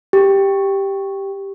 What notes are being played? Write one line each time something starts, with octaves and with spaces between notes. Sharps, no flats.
G4